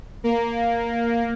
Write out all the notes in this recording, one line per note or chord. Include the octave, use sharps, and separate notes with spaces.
A#3